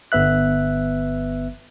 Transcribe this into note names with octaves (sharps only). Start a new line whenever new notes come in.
G1 B3 B4 E5 F#6